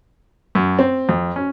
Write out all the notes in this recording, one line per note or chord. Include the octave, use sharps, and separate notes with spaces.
F#2
C4
F2
C#4